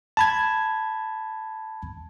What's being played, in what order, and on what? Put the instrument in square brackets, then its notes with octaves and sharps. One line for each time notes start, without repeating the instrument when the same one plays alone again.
[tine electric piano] A5 B5 G#6